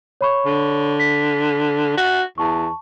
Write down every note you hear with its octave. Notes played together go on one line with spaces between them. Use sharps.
C#5 B5 C#6
D3
B6
F#4
E2 A5 C#6